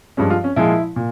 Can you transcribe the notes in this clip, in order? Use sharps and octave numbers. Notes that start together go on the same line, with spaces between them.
G2 F3 G#3 C#4
F4
C#4
A#2 F3 G#3 E4
A#2